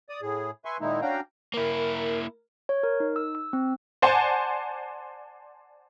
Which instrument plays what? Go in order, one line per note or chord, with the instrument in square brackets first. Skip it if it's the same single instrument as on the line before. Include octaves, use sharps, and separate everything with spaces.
[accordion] D5 D#6
A2 G#4
B4 E5 G#5 C6 C#6
A#2 D#3 G#3 A#3 D#4 E4
C#4 D4 F#4 F5 G5 A#5
[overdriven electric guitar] A#3 E4 [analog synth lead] A#4
[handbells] C#5
A#4
D#4
E6
E6
C4
[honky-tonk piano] C5 D5 F#5 G#5 A5 C6